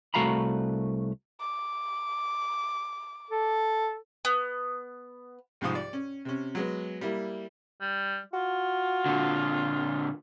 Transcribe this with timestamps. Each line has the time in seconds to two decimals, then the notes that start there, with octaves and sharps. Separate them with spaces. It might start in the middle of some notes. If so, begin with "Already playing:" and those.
0.14 C2 A3 F#4 F5 A#5 B5
1.40 D6
3.31 A4
4.25 B3
5.61 C2 G#2 F3 D#6
5.75 D5
5.93 C#4
6.25 C3 C#4
6.55 F#3 G#3 B3
7.01 G3 A#3 E4
7.81 G3
8.33 F4 F#4
9.06 A#2 D3